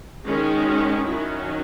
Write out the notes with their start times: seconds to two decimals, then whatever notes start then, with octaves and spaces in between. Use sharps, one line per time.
0.25 D#3 G#3 C#4
0.65 F#4
1.06 D#3 F#3 C#4 E4